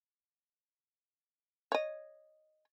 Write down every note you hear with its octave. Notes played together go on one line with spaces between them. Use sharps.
C#5 D#5